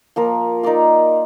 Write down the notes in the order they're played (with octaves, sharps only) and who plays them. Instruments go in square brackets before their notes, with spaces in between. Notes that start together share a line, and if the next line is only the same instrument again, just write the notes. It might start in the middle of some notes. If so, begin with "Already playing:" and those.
[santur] F3 A#3 F4 A#4
D#4 A#4 D5 F5